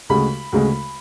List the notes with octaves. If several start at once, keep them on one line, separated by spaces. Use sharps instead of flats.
D2 C#3 G#3 B5
D2 C#3 G#3